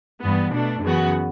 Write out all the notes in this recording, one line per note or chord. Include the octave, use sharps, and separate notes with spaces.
G2 E3 B3
B2 A3 D4
F#2 C#3 E3 B3 F#4